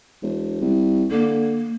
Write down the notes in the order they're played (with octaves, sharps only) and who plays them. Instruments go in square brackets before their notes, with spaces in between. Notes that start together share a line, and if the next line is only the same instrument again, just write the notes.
[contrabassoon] E1
C2
[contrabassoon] D3 [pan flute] A#3